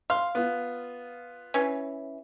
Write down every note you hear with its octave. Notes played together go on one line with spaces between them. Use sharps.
F5 C6
B3 F4
E3 C#4